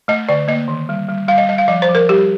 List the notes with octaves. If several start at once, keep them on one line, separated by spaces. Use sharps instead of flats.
A3 D#5
D3 D5
A#3 D#5
D#3
G3
G3
G3 F5
D#5
G3 D#5
F5
F3 D#5
C5
F3
A#4
G3 G4